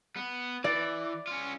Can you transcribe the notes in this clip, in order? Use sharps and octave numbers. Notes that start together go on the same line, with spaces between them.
B3
E3 D5
C#4 F4